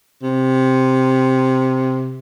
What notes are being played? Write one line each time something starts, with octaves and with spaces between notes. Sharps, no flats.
C3